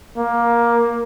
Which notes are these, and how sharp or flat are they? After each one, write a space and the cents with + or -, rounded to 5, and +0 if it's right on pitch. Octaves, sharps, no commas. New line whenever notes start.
A#3 +15